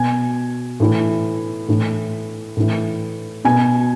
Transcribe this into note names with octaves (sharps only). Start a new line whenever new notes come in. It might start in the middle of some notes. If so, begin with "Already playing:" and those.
Already playing: B2 G#5
A2 E3
A2 E3
A2 E3
B2 G#5